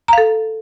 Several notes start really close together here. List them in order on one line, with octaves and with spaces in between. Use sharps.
A#5 F5 A4